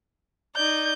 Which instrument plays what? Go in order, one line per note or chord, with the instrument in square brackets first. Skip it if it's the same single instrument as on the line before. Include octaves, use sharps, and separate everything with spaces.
[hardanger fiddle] D#4 D5 [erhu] G6